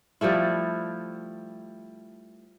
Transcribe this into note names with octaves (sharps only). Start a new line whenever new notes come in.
F3 G3 A3 E4